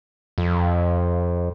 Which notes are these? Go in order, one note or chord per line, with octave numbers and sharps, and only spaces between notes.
F2